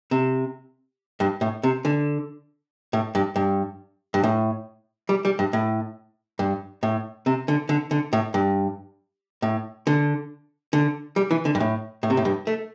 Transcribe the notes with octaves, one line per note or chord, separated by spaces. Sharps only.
C3
G2
A2
C3
D3
A2
G2
G2
G2
A2
G3
G3
G2
A2
G2
A2
C3
D3
D3
D3
A2
G2
A2
D3
D3
G3
E3
D3
G2
A2
A2
C3
A2
G2
A3